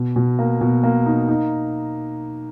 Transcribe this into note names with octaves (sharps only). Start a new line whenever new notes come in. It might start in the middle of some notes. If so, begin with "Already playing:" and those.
Already playing: B2
B2
A#3
B2
A#3
D#4
D#4